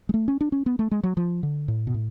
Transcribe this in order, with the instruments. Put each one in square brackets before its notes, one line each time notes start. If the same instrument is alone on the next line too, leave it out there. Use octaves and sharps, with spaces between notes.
[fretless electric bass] G#3
A3
C#4
D4
C#4
B3
A3
G#3
F#3
F3
D3
A2
B2
A2